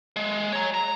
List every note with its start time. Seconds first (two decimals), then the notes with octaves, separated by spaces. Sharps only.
0.16 G#3
0.53 C#5 A#5
0.74 A#5